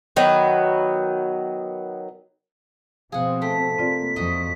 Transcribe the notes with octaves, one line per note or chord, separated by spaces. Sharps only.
D#3 F#3 B3
B2 F3 C4 G#4 F5 F#5
A3 G5 B6
C3 A#3 C4 F4 D5
F2 F3 F#4 D#5